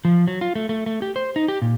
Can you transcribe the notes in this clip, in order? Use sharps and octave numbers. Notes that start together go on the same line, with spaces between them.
F3
F#3
F4
A3
A3
A3
G4
C5
D#4
G4
A#2